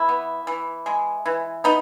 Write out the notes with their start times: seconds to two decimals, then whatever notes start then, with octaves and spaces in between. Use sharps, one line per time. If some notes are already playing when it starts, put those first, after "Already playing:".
Already playing: E3 E4
0.09 B3
0.47 E3
0.86 G#3
1.26 E3
1.64 B3 D#4